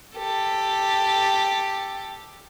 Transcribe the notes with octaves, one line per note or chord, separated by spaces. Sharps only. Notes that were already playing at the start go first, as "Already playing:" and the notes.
G4 A4